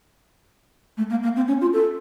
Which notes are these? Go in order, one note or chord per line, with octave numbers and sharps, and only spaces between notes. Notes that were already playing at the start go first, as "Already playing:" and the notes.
A3
A#3
A#3
C4
C#4
F4
A4